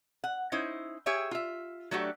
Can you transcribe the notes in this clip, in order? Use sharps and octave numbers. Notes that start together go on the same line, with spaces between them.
F#5
C#4 D#4 E4 C5
G4 G#4 C#5 E5 G5 G#5
F4 E5
F#3 A3 D4 F#4 G4